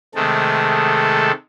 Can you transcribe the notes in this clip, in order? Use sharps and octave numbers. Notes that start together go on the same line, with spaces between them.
C3 D#3 G#3 A3 A4